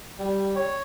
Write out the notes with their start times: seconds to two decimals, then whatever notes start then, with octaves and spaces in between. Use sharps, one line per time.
0.19 G3
0.56 C#5